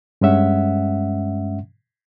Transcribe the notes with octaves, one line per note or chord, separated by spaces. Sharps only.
G2 G#3 C#4 E5 F#5